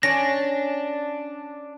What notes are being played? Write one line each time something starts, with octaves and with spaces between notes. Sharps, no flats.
C#4 D4 C#5 A#6